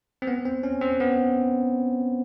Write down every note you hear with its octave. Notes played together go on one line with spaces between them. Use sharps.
C4
B3
C4
C#4
C4
B3